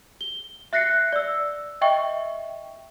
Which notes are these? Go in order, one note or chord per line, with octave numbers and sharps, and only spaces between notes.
G7
E5 F#6 A#6 C7 C#7
D5 E6
D#5 E5 G5 C#6